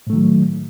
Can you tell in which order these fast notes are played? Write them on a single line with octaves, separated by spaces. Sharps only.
A2 A3 D#3 F#3